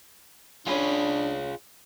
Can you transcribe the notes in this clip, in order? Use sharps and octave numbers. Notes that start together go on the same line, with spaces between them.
C#4 D4 F4 G#4 B4 C#5